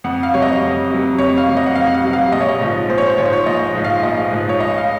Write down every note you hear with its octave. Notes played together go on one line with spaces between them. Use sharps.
F2 F#5
F5
C3 F#3 C#5
D#5
F2
C3 F#3
F2 C#5
F5
C3 F#3
D#5
F#5
F2 F5
F#5
F5
C3 F#3
F5
A#1 D#5
C#5
D#5
G#2 F3
A#1 C5
C#5
C5
G#2 F3 C#5
C5
C#5
A#1 D#5
G#2 F3
F5
A#1 D#5
G#2 F3
C#5
C#2 D#5
F5